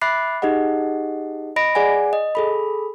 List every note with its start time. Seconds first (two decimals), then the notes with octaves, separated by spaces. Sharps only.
0.01 E5 B5 D6 F#6 A6 C7
0.42 D#4 G4 G#4 D#5 F#5
1.56 D#5 B5 A#6 D7
1.75 G#4 D5 F#5 G#5
2.13 D#5
2.35 G#4 A4 B5